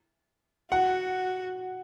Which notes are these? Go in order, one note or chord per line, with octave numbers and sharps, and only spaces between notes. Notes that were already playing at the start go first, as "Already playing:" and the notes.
F#4 F#5